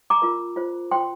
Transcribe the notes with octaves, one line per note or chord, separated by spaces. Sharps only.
A#5 D6
F4 A#4
F4 C5
F4 C5 G5 C6